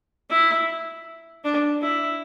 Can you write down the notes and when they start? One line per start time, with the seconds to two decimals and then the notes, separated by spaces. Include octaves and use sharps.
0.30 E4
1.44 D4
1.82 E4